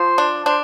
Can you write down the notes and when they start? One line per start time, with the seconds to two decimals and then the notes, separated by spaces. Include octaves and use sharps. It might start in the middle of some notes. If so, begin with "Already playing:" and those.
Already playing: F3 C5
0.18 D4
0.46 D4 C5